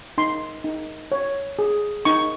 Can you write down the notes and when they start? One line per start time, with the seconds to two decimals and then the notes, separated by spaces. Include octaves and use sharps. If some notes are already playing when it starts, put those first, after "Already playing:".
0.18 D#4 C6
0.64 D#4
1.12 C#5
1.59 G#4
2.05 D#4 C#6